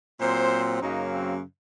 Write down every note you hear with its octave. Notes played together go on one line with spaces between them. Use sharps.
A#2 F#3 C4 C5
F#2 C#3 F#3 A#3 D#4
C4